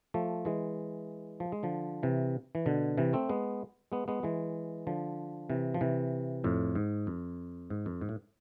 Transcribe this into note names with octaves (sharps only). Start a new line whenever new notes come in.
F3 A3
E3 G#3
F3
G#3
D3 F3
C3 E3
E3
B2 D3
C3 E3
A3 C4
G#3 B3
G#3 B3
G#3 B3
E3 G#3
D3 F3
C3 E3
F3
C3 E3
F2 A2
G#2
F2
G#2
F2
G#2
A2